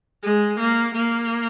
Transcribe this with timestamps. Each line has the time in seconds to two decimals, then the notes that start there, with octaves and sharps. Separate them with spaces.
0.23 G#3
0.59 A#3
0.95 A#3